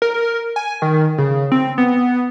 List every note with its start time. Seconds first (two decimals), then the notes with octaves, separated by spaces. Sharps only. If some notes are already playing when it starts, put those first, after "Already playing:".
0.02 A#4
0.56 G#5
0.82 D#3
1.18 C#3
1.52 C4
1.78 B3